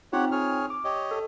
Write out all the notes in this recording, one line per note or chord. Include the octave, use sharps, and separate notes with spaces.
C4 D#4 F4 G4 C#5 F#5
G#4 C#5 F6
D6
G4 C#5 D#5
A4